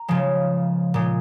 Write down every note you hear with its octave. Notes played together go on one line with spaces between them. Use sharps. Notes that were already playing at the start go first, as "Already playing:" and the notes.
Already playing: A#5
C#3 F3 G#3
A#2 G#3